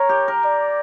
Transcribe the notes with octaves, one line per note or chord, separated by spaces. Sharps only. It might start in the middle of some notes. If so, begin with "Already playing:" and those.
Already playing: A#4 C#5
G4
A#4
D5